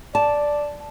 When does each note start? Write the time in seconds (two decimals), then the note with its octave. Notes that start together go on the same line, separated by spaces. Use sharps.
0.15 D5 A5